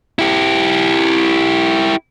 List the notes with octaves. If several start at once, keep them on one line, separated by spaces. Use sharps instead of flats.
E4 G4